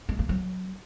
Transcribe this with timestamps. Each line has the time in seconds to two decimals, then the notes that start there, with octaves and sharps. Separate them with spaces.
0.09 G#3
0.19 A#3
0.29 F#3